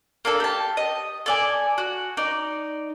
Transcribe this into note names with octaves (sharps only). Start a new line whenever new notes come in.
A#3 D4 A4
G4 A5
D#5
A4 D5 G#5
F#4
D#4 D5